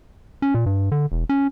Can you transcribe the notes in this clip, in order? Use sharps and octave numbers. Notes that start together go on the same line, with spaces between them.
C#4
A#2
G2
D3
E1
C#4